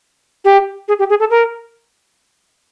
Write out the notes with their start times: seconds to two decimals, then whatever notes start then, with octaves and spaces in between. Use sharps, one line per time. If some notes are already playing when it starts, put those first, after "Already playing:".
0.45 G4
0.88 G#4
0.99 G4
1.10 G#4
1.20 A4
1.30 A#4